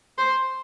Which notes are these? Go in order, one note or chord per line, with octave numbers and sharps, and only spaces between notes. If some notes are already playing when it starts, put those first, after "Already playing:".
C5